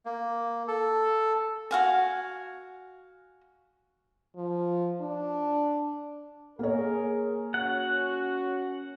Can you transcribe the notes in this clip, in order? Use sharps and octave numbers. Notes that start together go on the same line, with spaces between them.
A#3
A4
F#4 F5 G#5
F3
D4
A#3 G#4 A#4 C#5
C#4 F#4 F#5